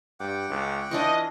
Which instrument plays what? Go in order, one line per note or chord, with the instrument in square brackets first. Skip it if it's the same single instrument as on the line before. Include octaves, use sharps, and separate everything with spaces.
[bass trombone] G2 [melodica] F#5 G5 D6
[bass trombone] C#2
[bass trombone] E3 [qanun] D4 F4 C#6 [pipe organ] D#5